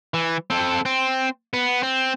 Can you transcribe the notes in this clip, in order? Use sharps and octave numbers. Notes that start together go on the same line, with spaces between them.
E3
C4 A4
C4
B3
C4